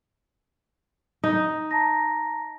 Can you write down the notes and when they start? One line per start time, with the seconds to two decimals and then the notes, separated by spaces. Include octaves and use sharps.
1.24 D#4
1.71 A5 A#5 A#6